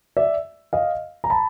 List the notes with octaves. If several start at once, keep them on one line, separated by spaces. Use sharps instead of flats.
D5 E5
D#5 F5
A#5
A5 B5